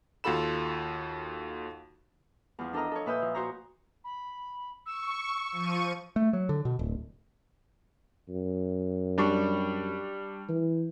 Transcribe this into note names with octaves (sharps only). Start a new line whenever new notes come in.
D#2 F4 F#4 A4 B5 E7
E2 F3
D4 A4 A#4 D#5 A#5
A4 C#5
A#2 B4 E5 D#6 E6 G6
F3
F#4 C5 C#5 A#5
B5
C#6 E6
F3 C#6 D#7
A3
F#3
D3
B2
D1
F#2
G3 D4 C#6
E3